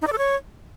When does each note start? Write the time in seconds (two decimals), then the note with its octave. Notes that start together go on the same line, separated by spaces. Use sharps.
0.02 D#4
0.07 D5
0.13 A4
0.18 C#5